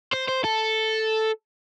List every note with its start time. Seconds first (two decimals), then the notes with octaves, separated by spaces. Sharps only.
0.13 C5
0.28 C5
0.44 A4